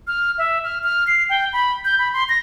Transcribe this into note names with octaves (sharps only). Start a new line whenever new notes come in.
F6
E5
F6
F6
C7
G5
B5
G6
B5
C6
A#6